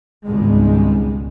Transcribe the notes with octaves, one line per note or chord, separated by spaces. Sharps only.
G#1 C#2 G#2 B2 G3 G#3